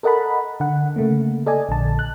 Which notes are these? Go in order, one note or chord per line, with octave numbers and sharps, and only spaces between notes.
A4 A#4 D#5 F#5 A5 B5
D3 F#5
C#3 A3 A#3
A4 D5 D#5 G#5
A#1 D3 A5
F#6